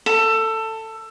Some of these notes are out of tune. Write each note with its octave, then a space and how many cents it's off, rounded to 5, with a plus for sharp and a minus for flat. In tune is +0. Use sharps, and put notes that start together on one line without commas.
A4 +15